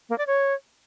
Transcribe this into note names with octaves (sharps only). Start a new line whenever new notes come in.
A#3
D5
C#5